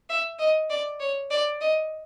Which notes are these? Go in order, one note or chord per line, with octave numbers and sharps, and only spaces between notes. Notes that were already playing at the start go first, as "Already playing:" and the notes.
E5
D#5
D5
C#5
D5
D#5